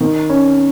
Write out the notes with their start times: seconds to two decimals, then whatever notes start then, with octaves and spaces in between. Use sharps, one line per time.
0.01 D#3
0.30 C#4